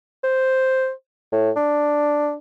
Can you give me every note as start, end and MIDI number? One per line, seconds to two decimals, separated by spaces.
0.23 0.91 72
1.32 1.50 45
1.56 2.35 62